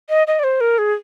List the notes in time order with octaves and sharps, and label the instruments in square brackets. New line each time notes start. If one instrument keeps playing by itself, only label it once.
[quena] D#5
D#5
D5
C5
A#4
G#4